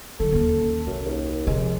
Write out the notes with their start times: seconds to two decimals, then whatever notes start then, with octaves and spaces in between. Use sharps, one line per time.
0.20 D3 F#3 A4
0.32 D#2 C#4
0.87 C2 F#2
1.05 D#2
1.47 C3 F3 G#3